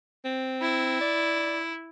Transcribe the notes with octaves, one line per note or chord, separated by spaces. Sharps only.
C4
E4
D5